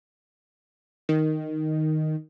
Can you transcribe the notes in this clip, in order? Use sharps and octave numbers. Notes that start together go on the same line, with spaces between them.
D#3